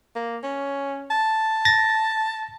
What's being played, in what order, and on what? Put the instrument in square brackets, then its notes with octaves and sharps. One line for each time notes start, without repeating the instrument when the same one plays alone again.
[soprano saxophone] A#3
C#4
A5
[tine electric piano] A6 A#6